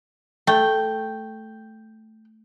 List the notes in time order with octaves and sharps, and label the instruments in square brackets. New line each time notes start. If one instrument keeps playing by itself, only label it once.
[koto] A3 [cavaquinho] G5